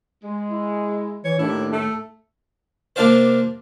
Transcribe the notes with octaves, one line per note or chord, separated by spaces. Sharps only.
G#3
E4
E3 C#5
D#2 A2 D4 E4
A3 A4
C3 A#3 D4 F4 C5